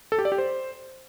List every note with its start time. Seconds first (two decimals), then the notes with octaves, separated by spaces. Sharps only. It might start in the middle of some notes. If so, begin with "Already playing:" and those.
0.12 A4
0.19 G4
0.25 D5
0.32 G4
0.38 C5